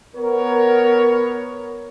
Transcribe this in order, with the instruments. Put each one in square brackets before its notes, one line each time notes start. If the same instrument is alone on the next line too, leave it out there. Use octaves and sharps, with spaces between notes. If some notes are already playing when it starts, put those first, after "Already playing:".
[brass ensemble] B3 A#4 C#5